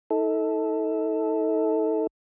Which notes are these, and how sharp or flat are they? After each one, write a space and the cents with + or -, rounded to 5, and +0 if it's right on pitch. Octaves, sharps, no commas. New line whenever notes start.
D#4 +45 A4 +0